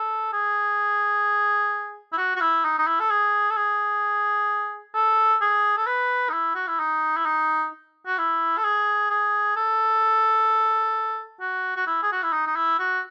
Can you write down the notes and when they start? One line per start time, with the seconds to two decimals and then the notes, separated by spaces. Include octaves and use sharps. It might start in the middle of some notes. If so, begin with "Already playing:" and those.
Already playing: A4
0.33 G#4
2.13 E4
2.18 F#4
2.36 F#4
2.41 E4
2.64 D#4
2.78 D#4
2.87 E4
3.00 A4
3.10 G#4
3.51 A4
3.56 G#4
4.95 A4
5.41 G#4
5.77 A4
5.87 B4
6.29 D#4
6.33 E4
6.55 F#4
6.67 E4
6.79 D#4
7.17 E4
7.25 D#4
8.06 F#4
8.18 E4
8.58 A4
8.64 G#4
9.10 G#4
9.56 A4
11.41 F#4
11.76 F#4
11.87 E4
12.03 G#4
12.12 F#4
12.23 E4
12.33 D#4
12.47 D#4
12.56 E4
12.79 F#4